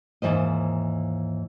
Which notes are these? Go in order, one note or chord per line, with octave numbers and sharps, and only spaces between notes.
D#2 G#2 C#3 E3 C5 D#5